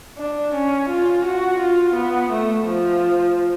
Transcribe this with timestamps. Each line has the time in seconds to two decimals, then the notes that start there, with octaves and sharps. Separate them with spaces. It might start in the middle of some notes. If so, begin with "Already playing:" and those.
0.18 D4
0.54 C#4
0.89 F4
1.25 F#4
1.60 F4
1.95 B3
2.32 A3
2.66 F3